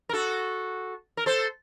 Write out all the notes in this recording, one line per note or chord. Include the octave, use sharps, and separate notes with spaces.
A#4
F#4 A4
A#4
A4 C5